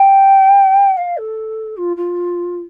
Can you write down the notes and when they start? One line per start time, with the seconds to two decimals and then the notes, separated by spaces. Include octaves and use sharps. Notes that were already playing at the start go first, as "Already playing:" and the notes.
Already playing: G5
0.97 F5
1.17 A4
1.77 F4
1.97 F4